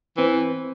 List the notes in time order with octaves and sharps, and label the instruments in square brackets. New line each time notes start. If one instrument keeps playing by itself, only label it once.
[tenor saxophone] E3 [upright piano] C4